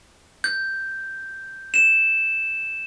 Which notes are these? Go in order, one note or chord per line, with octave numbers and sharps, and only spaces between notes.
G6
E7